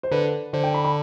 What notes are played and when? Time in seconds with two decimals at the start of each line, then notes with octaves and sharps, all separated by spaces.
0.03 C5
0.11 D3 B4
0.53 D3 C5
0.64 G5
0.74 B5
0.85 B5